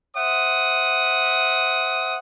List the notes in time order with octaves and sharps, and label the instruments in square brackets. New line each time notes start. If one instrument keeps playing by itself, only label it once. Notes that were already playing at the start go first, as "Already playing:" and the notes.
[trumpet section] C5 E5 F#5 D#6